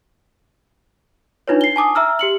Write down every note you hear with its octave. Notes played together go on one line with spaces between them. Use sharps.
D4 D#4 F4 B4 C#5
C7 G7
G#5 A5 D6 D#6
E5 A#5 E6 F6
G4 C#7 F#7